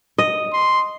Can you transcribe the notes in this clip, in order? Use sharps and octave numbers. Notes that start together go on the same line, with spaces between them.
D#5
C6